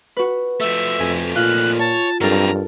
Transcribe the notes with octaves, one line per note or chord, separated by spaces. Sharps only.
F#4 B4
F3 A3 E5
F2 G#5
A#2 F4 F#6
C#5 A5
G2 F#3 C4 A4 A#4 A#5